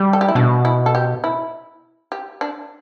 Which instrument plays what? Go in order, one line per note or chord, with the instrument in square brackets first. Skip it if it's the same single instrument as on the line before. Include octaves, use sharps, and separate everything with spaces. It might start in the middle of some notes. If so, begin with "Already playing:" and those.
Already playing: [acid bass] G3
[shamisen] A4
G4
E4
[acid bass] B2 [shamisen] D4
[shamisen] E4
A4
G4
E4
G4
D4